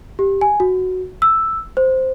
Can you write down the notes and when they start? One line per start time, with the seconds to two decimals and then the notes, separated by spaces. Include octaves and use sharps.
0.19 G4
0.41 G#5
0.60 F#4
1.22 E6
1.77 C5